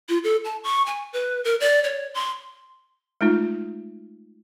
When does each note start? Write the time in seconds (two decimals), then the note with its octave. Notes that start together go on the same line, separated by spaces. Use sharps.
0.09 F4
0.24 A4
0.45 A5
0.64 C#6
0.86 G#5
1.13 B4
1.44 A#4
1.60 D5
1.84 C#5
2.14 C6
3.21 G#3 A3 D#4 F4